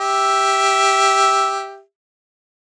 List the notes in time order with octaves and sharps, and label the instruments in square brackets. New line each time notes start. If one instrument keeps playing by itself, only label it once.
[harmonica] G4 E5